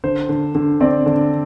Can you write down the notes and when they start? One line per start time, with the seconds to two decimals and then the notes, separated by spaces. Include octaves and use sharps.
0.04 D3 C5
0.29 D3
0.55 D3
0.80 C4 D5
1.06 D3